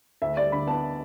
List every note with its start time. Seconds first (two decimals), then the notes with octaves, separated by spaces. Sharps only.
0.22 D2 E5
0.37 G3 D5
0.52 D3 B5
0.67 B3 A5